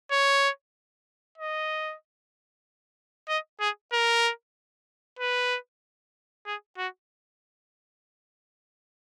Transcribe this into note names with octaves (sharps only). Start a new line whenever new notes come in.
C#5
D#5
D#5
G#4
A#4
B4
G#4
F#4